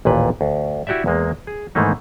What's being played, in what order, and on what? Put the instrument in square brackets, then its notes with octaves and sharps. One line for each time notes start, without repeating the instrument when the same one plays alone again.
[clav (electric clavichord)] A1 D#2 A#2 B4
D2
E4 F#4 G4 D5 E5
E2 G#3 A#3
G#4
G#2 D#3 E3 A3 A#3 D#4